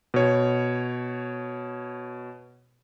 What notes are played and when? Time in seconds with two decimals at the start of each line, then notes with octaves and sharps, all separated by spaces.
0.14 B2 C#5